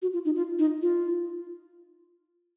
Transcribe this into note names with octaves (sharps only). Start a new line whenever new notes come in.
F#4
F4
D#4
F4
D#4
F4